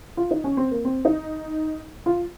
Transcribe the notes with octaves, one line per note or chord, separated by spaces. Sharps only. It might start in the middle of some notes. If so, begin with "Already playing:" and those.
F4
D#4
C#4
C4
A#3
C4
D#4
F4